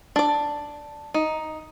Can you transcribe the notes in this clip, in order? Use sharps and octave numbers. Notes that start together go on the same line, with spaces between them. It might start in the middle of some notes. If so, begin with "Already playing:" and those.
D4 D5
D#4